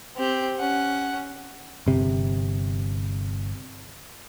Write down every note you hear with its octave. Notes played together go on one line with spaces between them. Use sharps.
C4 G4
C#4 F#5
G1 C3